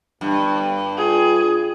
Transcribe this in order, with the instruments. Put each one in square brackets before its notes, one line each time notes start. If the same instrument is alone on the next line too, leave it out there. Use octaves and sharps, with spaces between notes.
[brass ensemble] G1 [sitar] G2
[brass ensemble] F4 [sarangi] G#4